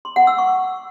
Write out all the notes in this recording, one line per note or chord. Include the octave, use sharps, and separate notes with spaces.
C6
F#5
E6
C#6